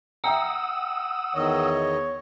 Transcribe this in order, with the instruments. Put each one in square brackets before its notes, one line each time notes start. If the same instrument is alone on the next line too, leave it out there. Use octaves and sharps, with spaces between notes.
[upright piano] E5 G5 A#5 [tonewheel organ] F#5 D#6 E6
[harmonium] E2 D#3 D#5 [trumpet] C#5